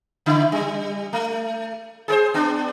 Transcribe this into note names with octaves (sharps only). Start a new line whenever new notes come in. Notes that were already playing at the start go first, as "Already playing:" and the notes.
C#3 E4
G3
A3
G#4 A#4 C5
B3 D4